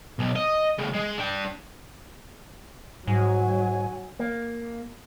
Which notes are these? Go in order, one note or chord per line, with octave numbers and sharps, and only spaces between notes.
B1
D#5
A2 C#3
G#3
D4 G5
G#2 F#3 G#5
A#3